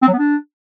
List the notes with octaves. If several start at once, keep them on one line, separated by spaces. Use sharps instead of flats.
C4
F#3
B3
D4